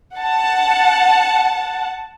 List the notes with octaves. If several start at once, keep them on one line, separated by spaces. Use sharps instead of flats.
F#5 A5